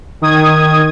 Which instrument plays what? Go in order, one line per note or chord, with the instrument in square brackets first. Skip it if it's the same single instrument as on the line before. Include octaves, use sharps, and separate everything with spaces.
[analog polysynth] D#3 D#6 G#6